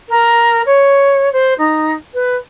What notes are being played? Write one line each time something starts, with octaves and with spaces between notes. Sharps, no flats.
A#4
C#5
C5
D#4
B4